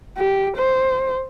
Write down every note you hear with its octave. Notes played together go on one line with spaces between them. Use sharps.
G4
C5